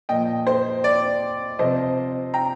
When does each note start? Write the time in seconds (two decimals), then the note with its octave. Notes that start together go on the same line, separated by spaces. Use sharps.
0.09 A#2 F3 D#5 G5
0.47 C5
0.84 D5
1.59 C3 F3 C5 D#5
2.34 G5 A#5